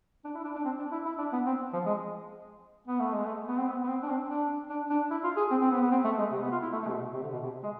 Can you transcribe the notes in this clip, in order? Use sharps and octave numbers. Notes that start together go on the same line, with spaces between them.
D4
E4
D4
D4
C4
D4
E4
E4
D4
B3
C4
F3
G#3
B3
A3
G#3
A3
B3
C4
B3
B3
C4
D4
C4
D4
D4
D4
E4
F4
G#4
C4
C4
B3
B3
C4
A3
G#3
C3
B3
F4
E4
A3
A3
C3
B2
C3
D3
B2
C3
G#3